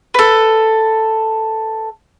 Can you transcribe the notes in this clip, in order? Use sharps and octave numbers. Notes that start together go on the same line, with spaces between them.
A4 B4